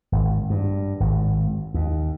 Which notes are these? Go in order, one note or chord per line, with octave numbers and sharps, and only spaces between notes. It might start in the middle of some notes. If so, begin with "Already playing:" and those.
G#1
G2
G#1
D#2